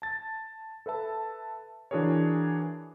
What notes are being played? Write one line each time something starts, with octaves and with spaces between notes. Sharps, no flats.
A5 A6
A4 B4 E5 A5
E3 D4 F#4 G#4 A#4 C#5